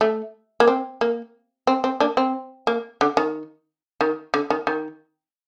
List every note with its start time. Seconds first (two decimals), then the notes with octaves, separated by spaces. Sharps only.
0.01 A3
0.60 A#3
0.68 C4
1.01 A#3
1.67 C4
1.84 C4
2.00 A#3 D4
2.17 C4
2.67 A#3
3.01 D3
3.17 D#3
4.01 D#3
4.34 D3
4.50 D#3
4.67 D#3